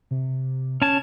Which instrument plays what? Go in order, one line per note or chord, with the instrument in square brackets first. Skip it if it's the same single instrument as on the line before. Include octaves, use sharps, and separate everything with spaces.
[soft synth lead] C3
[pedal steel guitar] C#4 A5 [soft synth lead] G#6